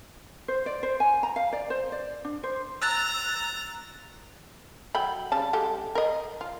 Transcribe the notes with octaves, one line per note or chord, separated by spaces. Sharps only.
C5
D5
C5
G#5
A#5
F5
D5
C5
D5
D4
C5
A#5 E6 F#6 A6
F#3 G5 B5
C#3 G3 A5
G#3 G4 A4
A#4 D#5
F4